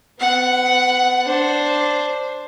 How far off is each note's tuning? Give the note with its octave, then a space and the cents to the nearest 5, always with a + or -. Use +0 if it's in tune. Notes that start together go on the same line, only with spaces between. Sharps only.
B3 +40 F#5 +0
D4 +0 C5 +0